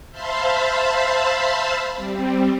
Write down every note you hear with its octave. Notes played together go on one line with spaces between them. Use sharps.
C5 E5 F5 A5 B5 C6
G3 C4